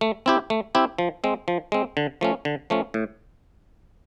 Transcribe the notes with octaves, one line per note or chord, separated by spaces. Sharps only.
A3
C4 E4 G4
A3
C4 E4 G4
F3
G#3 C4
F3
G#3 C4
D3
F3 A3 C#4
D3
F3 A3 C#4
A2